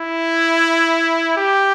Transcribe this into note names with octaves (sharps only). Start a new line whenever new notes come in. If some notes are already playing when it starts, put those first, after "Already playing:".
Already playing: E4
G4